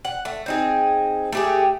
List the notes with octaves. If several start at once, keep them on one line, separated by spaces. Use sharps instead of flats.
F#5
A3
C4 D#4 G#4
A3 G4 G#4